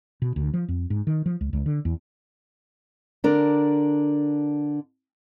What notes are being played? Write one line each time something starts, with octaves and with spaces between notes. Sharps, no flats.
B2
D2
F3
F2
G#2
D#3
F3
C#2
C#2
D3
E2
D3 D4 A#4